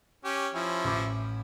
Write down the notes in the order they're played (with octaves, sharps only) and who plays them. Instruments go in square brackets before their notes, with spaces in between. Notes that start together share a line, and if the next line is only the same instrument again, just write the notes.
[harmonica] C#4 G4
F3 C#4 E4
[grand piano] A1 B5 D6